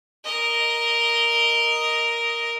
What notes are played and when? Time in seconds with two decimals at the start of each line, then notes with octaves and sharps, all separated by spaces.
0.24 A#4 D#5